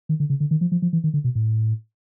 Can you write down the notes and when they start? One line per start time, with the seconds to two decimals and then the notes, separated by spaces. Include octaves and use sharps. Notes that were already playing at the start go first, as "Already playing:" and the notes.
0.09 D#3
0.20 D3
0.30 C#3
0.40 D3
0.51 D#3
0.61 F3
0.72 F3
0.82 F3
0.93 E3
1.04 D#3
1.14 D3
1.24 B2
1.35 A2